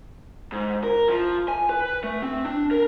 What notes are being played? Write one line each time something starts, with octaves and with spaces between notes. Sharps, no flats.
G#2
A#4
F3
G#5
B4
A3
C4
D4
A#4